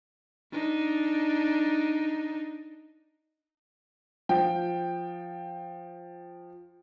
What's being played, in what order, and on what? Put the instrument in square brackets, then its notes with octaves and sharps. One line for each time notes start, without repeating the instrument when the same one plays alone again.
[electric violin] D4 D#4
[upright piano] F3 G5